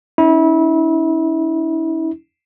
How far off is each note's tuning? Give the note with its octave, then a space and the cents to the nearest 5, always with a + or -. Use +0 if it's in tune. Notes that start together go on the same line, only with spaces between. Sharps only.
C#4 +35 E4 -30